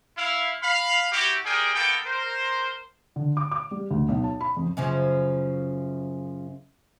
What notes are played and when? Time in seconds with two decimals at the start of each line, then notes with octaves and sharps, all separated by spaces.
0.17 E4 F5
0.63 F5 B5
1.13 E4 F#4 G4
1.45 G3 G#4 A#4 G5
1.75 A#3 B3 A4 G5
2.06 A#4 C5
3.16 D3
3.37 D6
3.51 D6
3.71 G3
3.91 D2
4.08 B1
4.24 A5
4.41 B5
4.57 F2
4.77 F#2 C#3 F3